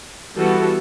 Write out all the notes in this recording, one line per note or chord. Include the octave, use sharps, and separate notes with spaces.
E3 G3 B3 F#4 A4